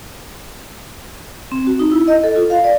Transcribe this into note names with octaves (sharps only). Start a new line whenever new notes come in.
C4
F#4
D#4
E4
D#5
A4
F4
F5
D5